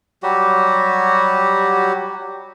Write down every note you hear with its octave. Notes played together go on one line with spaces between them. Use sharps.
F#3 G3 F#4 G4